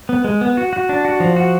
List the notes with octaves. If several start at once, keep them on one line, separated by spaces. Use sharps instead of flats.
B3
G#3
B3
F#4
F#4
D4
F#4
F3
F#4